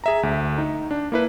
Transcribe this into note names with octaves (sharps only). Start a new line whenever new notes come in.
G#4 E5 A#5
D2
D#4
D4
A#3 E4 B4